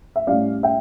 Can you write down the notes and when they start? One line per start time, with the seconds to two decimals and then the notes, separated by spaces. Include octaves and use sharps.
0.16 E5
0.27 A2 G3 C#4 D5 F5
0.63 E5 G5